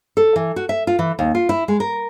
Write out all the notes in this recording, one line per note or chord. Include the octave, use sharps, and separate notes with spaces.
A4
E3
F#4
E5
F4
E3
D#2
F4
E4
G#3
A#4